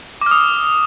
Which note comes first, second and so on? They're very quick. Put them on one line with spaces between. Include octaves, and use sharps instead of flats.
D6 F6 D#6